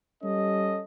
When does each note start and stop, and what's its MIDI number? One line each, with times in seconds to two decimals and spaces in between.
0.22 0.82 55
0.22 0.82 61
0.22 0.82 69
0.22 0.82 75